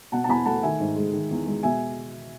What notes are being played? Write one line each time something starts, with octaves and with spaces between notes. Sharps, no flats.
B2 F#5 A5
A5
E2 G#5 B5
A3 F#5 A5
D#3 E5 G#5
G#2
G#3
D#3
E2
G#3
B2 E5 G#5